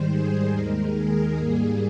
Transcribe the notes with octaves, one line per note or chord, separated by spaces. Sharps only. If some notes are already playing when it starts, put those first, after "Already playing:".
Already playing: G#2 D#3 G3 C5
G#4
D#2 D#3 G#3 A#4
G#4
G#2 G3 A#3 G#4